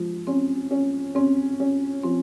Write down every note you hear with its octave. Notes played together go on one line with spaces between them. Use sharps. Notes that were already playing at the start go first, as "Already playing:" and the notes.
Already playing: F3 G#3
C4 C#4
C#4
C4 C#4
C#4
F3 C4